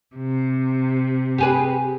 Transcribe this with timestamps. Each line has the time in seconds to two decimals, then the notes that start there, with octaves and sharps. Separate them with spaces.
0.16 C3
1.38 G4 G#4 B4